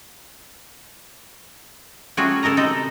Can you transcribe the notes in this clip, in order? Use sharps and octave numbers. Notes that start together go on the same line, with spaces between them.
G3 A3 C#4 F4 F#4 G#4
C#3 A4 A#4 D#5 A#5
G3 C4 D#4 A4 D#5